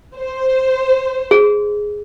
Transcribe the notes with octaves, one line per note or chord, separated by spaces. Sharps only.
C5
G#4